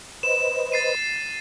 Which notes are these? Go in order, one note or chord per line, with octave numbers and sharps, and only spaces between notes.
B4 C5 D#5 E7
A6 C7 D#7